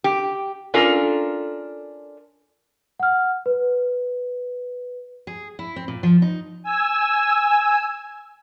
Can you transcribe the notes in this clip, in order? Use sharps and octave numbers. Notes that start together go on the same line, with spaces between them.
G4
C#4 D4 F4 A4 A#4
F#5 F6
B4
G#4
E4
C4
A#2
F3
D#4
G#5 E6